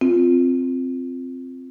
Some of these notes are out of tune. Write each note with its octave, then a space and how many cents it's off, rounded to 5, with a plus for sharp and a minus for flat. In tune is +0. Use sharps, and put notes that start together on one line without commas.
C4 +0 F4 +0